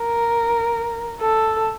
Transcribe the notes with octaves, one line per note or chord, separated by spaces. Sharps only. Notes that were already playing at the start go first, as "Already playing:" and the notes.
Already playing: A#4
A4